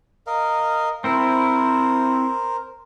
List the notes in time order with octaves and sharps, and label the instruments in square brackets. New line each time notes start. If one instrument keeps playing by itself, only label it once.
[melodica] A#4 D#5 F5
[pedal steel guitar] C4 E4 [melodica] A#4 C5